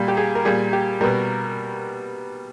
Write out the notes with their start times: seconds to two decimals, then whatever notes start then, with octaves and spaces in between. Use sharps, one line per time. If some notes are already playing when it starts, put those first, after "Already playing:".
Already playing: A#2 G3
0.08 G4
0.17 G#4
0.35 A#4
0.45 A#2 G3 G#4
0.73 G4
1.01 B2 G3 A#4